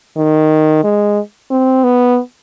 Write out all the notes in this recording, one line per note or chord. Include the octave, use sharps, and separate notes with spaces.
D#3
G#3
C4
B3